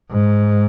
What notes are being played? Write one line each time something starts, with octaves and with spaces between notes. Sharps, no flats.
G#2